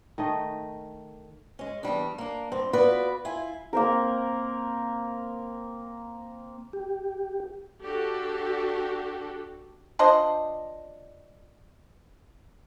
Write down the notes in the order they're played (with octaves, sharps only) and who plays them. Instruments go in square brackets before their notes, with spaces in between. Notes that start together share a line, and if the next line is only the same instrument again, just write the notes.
[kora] D#3 A3 D#5
[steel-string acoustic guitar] G#3 C#4
E2 G2 G3 D4
A#3 D4
G2 C4
B3 F4 F#4 B4 D5
E4 F4 G#5
[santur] A#3 C4 A#4
[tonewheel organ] G4
[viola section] D4 F#4 G4 A4
[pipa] D4 F4 C5 D#5